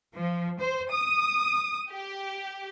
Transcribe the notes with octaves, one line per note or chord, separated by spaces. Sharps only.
F3
C5
D#6
G4